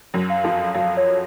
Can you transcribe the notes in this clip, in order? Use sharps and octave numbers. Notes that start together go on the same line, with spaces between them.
F#2 F#3
F5
F2 F3
F#2 F#3 F5
C#5